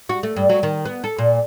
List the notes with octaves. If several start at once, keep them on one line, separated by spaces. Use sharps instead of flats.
F#4
A3
G2
F#3
D#3
B3
A4
A#2